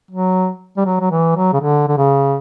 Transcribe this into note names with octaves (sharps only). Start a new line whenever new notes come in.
F#3
G3
F#3
F#3
E3
F#3
C#3
D3
D3
C#3